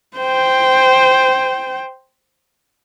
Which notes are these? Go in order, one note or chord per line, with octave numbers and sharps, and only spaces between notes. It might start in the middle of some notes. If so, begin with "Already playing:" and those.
C5 G5